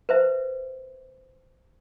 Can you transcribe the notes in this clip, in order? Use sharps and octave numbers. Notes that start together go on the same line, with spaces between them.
B4 C5 E5